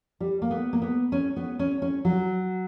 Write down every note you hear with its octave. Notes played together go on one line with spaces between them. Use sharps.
G3
A#3
B3
A#3
B3
C#4
B3
C#4
C#4
F#3